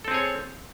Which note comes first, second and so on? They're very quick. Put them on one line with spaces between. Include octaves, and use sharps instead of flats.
A4 C4 G#4 C#5